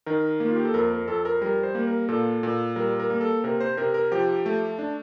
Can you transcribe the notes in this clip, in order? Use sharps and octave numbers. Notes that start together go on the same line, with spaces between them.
D#3 A#4
A#3
F4
G4
A4
F2 A#4
A#4
F2 A4
A#4
G3 A#4
C5
A#3
A#4
A#2 A4
A#2
G3 A#4
A#4
A#3
A4
C3 A#4
C5
C3 A#4
A#4
F3 G4
A3
D4